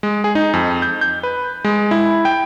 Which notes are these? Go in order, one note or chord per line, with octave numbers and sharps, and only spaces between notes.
G#3
G#4
D#4
F2
G6
G6
B4
G#3
E4
G5